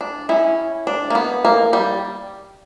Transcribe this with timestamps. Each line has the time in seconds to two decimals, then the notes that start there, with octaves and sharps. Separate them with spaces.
0.01 D4
0.29 C#4 E4
0.87 D4
1.10 A#3
1.15 B3
1.45 A#3
1.73 G3